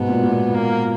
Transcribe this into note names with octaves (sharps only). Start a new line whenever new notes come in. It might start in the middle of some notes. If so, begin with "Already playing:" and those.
Already playing: G#2 B2 B3
A#2
A#2
A#3